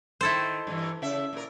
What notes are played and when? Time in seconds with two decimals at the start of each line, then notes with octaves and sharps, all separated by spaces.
0.21 D#3 E4 A4 C5
0.67 G2 E3
1.02 C#3 E5
1.33 A#2 A#4